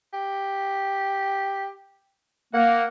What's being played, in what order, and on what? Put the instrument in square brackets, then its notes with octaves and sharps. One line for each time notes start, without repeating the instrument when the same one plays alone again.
[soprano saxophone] G4
[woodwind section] A#3 [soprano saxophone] F#5